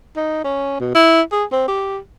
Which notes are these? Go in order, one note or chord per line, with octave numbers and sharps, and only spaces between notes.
D#4
C#4
B2
E4
G#4
C4
G4